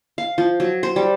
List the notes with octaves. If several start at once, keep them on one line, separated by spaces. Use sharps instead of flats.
F5
F3
F#3
C5
G3